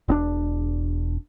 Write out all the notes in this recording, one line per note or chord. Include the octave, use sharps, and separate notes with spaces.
E1 C4 D4